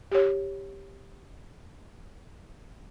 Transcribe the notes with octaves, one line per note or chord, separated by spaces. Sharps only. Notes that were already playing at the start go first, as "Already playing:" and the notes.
G4 C#5